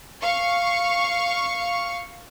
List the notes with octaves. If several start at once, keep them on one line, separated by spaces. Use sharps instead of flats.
F5 C#6